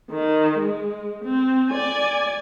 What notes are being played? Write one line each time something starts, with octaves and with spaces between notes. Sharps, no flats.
D#3
G#3
C4
D5 G#5